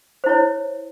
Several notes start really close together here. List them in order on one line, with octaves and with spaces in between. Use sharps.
C5 E4 C#5